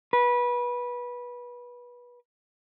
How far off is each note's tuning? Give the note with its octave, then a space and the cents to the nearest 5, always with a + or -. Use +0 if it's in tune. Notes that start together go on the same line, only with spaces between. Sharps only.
B4 -20